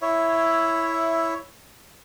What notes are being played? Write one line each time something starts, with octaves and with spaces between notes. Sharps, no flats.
E4 C#5 E5